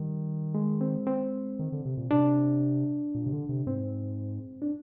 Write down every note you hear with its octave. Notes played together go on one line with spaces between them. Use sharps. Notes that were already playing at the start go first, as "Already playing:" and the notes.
Already playing: D#3 G3
G#3
C4
C4
D#3
D3
C3
A#2
C3 D4
A#2
C3
D3
C3
G#2 C4
D4